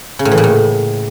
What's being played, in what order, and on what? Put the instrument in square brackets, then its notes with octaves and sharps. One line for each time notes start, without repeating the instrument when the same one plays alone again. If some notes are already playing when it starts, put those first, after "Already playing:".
[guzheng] C#3
A2
E3
A#2
A2